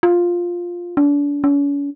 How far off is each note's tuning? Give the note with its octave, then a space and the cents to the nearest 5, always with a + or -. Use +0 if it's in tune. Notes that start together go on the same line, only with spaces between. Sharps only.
F4 +5
D4 -35
C#4 +40